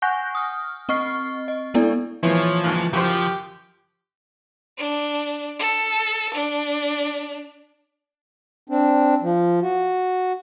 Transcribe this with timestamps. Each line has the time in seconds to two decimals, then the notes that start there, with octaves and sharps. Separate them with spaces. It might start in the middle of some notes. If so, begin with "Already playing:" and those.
0.02 F#5 G#5 C#6 F#6 G6 A#6
0.35 D#6 F6
0.89 C4 D#5 C#6 F6 C7
1.48 D#5
1.74 G#3 B3 D4 E4 A4 D5
2.23 A#2 E3 F3 G#3 C4 C#5
2.63 D#2 G#2 C#3 A#3
2.93 F#2 C#3 F3 G4 C5
4.78 D4
5.60 A4
6.34 D4
8.69 C4 D4
9.22 F3
9.62 F#4